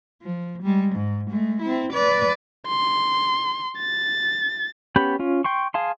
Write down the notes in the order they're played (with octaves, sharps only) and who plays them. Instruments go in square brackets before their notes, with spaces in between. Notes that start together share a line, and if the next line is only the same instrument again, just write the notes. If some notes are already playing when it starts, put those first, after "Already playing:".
[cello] F3
G3 G#3
G#2
G#3 A3
C4 E4
B4 D5
[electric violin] C6
A6
[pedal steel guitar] B3 C#4 G4 B5 G6
C#4 F4
G5 C6 C#6
G#4 F5 A5 C6